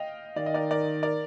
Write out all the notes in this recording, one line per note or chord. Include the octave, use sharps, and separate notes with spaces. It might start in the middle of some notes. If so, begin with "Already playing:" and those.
Already playing: D#5 F5 G5
D#3 D5
D#5
A#4 D5
A#4 D5
A#4 D5